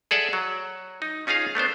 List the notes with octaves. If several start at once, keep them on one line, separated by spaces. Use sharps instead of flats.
G#4 A4 D5 E5 F#5
F#3
D#4
C#4 D#4 F4 G#4 F5
A3 B3 D4 C5